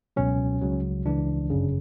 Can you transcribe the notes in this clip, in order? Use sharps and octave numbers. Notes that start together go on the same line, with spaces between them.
C#2 B2 F#3 C#4
C#2 C#3 F#3
C#2 C#3 E3 D4
G1 F#2 C#3